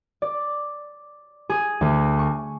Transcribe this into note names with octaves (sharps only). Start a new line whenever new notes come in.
D5
G#4
D2
C#6